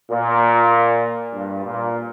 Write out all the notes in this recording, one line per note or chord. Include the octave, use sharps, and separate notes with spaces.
A#2
G2
A#2